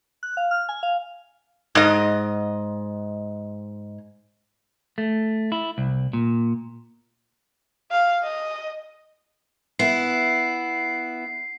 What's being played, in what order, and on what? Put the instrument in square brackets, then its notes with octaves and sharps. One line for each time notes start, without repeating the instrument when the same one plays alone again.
[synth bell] F#6
F5
F6
G#5
F5
[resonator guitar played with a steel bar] G#2 D#5
[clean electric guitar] A3
E4
C2
A#2
[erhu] F5
D#5
[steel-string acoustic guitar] B3 E4 [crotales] C7